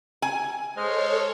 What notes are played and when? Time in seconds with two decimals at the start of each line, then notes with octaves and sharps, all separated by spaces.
0.22 G#5
0.77 G#3 A4 C5 C#5 D#5 F6